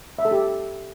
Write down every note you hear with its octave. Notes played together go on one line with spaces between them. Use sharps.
E5
A4
G4